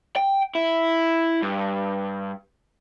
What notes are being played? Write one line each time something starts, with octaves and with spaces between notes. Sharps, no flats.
G5
E4
G2